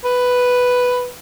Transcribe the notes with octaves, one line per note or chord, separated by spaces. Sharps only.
B4